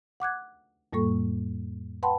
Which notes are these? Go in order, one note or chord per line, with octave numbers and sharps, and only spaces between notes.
F#5 D6 F#6 G#6
F2 A2 G3 A#3 A4 C#6
B4 F#5 G5 A5 B5 C6